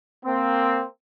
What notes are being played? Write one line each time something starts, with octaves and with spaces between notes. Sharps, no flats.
A#3 C4